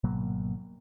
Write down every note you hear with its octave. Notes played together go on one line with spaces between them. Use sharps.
G#1 B2 F#3 A#3